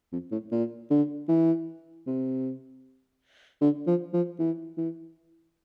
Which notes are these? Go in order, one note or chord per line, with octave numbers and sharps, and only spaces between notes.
F2
A2
A#2
D3
E3
C3
D3
F3
F3
E3
E3